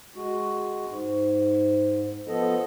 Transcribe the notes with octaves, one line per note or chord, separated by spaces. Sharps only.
G#3 F#4
G#2
F3 B3 A4 D#5